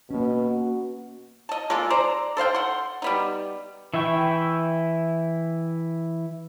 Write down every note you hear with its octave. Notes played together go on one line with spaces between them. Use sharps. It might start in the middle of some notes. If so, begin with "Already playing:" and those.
B2 A#3 C#4
F#4
D#5 A5
G#3 A#3 F4 A4
C5 D5 A#5
A4 C5 F5 G5
F#5 C6
G3 B3 D#4
E3 E4 E5 G5 C#6